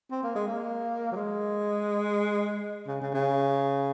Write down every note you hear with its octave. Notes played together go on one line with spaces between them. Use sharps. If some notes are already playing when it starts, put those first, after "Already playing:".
C4
A#3
G#3
A#3
F#3
G#3
C#3
C#3
C#3